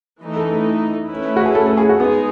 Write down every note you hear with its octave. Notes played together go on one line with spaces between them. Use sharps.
E3 A3 D#4
A4
A4
A3 C#4 E4 B4
F#4
G#4
A4
A4
G#4
F#4
G#3 B3 D#4 G#4